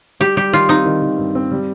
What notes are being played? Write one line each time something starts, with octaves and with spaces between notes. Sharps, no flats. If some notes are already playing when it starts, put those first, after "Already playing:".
G3 G4
G3 G4
D#3 F4
C4 D#4
D#3
D#3
G2
C4
G3